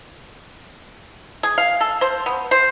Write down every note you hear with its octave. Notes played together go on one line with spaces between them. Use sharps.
G#4
F5
A4
C5
B3
C5